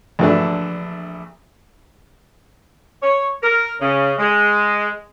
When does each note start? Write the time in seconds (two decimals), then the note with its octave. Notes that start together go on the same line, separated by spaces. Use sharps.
0.19 A#1 D3 E3 A3 D4
3.02 C#5
3.42 A#4
3.80 C#3
4.18 G#3